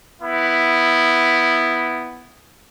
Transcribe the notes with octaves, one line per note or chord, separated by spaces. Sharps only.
B3 E4